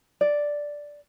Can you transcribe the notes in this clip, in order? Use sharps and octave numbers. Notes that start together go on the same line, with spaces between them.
D5